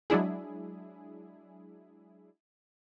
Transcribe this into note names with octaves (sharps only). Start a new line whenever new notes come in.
F#3 G#3 D4 E4 G#4